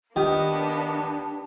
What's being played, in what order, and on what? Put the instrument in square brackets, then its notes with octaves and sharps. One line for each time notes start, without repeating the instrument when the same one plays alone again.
[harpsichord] D#3 [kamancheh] A#3 B3 [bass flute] D4 [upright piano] G4